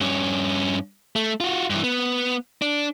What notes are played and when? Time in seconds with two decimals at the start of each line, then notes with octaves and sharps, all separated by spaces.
0.01 G2 C#4
1.16 A3
1.40 F4 F#4
1.70 G2 E3
1.84 B3
2.62 D4